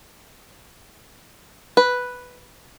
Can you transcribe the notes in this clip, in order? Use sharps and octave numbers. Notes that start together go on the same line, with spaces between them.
B4